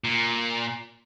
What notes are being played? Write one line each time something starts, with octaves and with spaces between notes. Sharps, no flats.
A#2